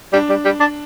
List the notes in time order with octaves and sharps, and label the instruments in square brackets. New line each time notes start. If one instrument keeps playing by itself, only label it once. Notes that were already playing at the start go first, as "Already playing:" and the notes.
[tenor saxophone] G3 [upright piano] D4
[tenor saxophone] G3
G3
D4